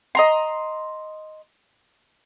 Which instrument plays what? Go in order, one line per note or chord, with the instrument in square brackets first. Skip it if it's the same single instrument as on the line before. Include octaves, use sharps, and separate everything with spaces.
[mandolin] D#5 A#5 C6